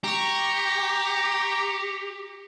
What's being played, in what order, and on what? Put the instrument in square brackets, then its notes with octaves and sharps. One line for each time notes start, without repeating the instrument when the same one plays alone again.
[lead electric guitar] G4 [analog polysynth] A#5 C#6